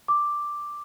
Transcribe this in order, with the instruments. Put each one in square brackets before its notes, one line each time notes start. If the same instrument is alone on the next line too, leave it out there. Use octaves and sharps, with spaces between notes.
[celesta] D6